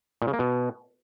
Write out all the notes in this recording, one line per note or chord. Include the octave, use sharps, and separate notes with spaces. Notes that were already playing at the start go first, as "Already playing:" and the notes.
A#2
C#3
A#3
B2